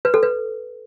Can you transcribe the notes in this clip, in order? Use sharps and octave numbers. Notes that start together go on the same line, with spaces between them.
B4
A4
B4